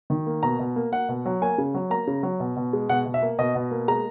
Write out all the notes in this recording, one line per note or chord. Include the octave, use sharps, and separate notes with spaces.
D#3
A#3
B2 A#5
B2
A#3
A#3 F#5
B2
F#3
A#3 G#5
C#3
F#3
A#3 A#5
C#3
F#3
B2
B2
G#3
B2 F#5
B2
E5
A#3
B2 D#5
B2
A#3
G#3 A#5